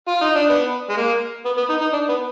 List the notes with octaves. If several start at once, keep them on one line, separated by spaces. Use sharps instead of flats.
F4
D#4
D4
B3
G#3
A#3
B3
B3
D#4
D#4
D4
B3